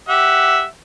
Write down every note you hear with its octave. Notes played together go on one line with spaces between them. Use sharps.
G4 E5 F#5